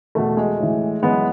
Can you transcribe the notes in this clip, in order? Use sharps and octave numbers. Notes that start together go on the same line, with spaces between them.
E2 B2 A3
G#3
A2 E3
F#2 E3 G#3 B3